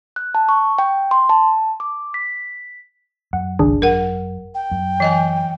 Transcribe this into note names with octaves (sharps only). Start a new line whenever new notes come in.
F#6
A5
C#6
G5
C6
A5
D6
B6
F#2 F#5
G#1 C#2 D4 G#4
F#2 A#4 F#5
G5
F#2
E3 D#5 G#5